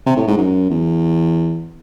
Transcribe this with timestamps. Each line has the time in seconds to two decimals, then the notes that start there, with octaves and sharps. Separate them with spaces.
0.06 C3
0.17 A2
0.27 G#2
0.38 F#2
0.70 E2